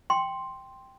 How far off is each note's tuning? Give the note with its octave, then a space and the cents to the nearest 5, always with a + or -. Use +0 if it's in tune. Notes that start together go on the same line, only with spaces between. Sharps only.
G5 +0 C6 +0